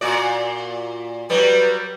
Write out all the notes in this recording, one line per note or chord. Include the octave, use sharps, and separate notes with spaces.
A#2 F#4 D5
F#3 G3 B4